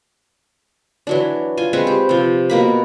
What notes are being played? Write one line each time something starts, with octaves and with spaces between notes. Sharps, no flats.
E3 F#3 D4
F4 G#5
G#3 C4 B4 C#6
G4
C3 F3
B2 A#3 B5